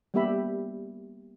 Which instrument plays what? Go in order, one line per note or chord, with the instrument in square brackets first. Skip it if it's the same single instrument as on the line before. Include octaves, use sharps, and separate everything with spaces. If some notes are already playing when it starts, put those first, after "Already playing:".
[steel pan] G3 A#3 B3 G4 E5 B5